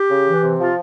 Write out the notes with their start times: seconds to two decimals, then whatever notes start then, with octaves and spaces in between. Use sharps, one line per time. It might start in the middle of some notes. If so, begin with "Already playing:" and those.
Already playing: G4
0.09 C#3
0.26 E3
0.42 C3
0.59 F3 F4